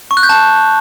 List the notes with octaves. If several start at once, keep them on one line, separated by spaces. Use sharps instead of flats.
C#6
F#6
G6
A5